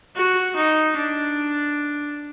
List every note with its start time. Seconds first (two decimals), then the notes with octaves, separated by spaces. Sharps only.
0.15 F#4
0.56 D#4
0.96 D4